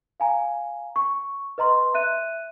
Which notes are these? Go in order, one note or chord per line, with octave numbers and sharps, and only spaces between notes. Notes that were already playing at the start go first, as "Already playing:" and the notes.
F5 G#5 A#5
C#6
B4 D#5 A#5 C6
E5 F#6 D#7